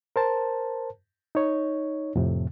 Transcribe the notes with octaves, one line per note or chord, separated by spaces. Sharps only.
A#4 C5 A5
D#4 C#5
F2 A2 C3